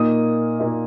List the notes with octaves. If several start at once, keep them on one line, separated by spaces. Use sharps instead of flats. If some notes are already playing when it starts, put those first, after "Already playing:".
Already playing: A#2 A#3 D#4 D#6
A#2 A#3 D#4